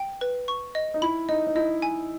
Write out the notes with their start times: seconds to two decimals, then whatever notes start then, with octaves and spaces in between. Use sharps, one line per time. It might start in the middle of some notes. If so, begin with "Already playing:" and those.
Already playing: G5
0.21 B4
0.48 C#6
0.75 D#5
0.94 D#4
1.02 E4 B5
1.29 D#4 D#5
1.47 D#4
1.55 E4 D#5
1.82 G#5